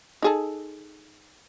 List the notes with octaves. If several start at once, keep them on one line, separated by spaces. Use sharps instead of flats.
D#4 G#4 A4